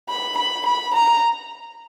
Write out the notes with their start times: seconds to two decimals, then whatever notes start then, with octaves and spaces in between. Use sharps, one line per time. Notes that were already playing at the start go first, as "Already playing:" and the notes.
0.09 B5
0.37 B5
0.66 B5
0.94 A#5